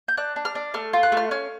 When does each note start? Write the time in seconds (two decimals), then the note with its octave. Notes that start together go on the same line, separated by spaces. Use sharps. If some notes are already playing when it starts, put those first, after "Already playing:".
0.08 G6
0.17 D4 F#6
0.36 D4
0.45 F6
0.55 D4
0.74 A3 F6
0.93 F4
1.03 F#6
1.12 A3
1.17 F6
1.31 C#4 F6